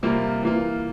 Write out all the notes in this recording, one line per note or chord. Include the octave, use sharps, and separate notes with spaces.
C3 G3 A#3 F4
E3 A#3 F4